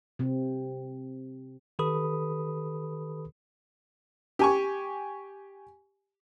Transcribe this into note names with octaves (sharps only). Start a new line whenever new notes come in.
C3 C4
D#3 G4 A4 B4 B5 D#6
G4 G#5 C#6